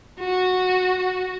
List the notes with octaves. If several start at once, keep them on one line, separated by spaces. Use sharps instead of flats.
F#4